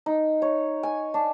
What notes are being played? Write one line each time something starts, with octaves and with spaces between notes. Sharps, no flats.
D#4
C#5
G#5
D4